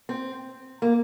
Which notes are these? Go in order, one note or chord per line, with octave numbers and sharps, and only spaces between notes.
C4
A#3